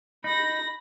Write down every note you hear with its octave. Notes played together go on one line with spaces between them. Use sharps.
D#4 B5 A#6